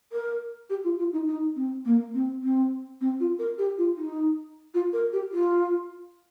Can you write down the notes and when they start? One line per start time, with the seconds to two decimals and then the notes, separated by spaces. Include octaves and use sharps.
0.12 A#4
0.70 G4
0.84 F4
0.99 F4
1.13 D#4
1.27 D#4
1.56 C4
1.85 A#3
2.14 C4
2.43 C4
3.01 C4
3.20 F4
3.39 A#4
3.58 G4
3.78 F4
3.97 D#4
4.74 F4
4.93 A#4
5.13 G4
5.32 F4